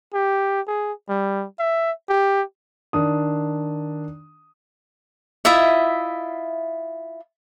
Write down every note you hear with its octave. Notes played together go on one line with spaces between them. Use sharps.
G4
G#4
G3
E5
G4
D#3 D4 D#6
E4 F4 D#5 E5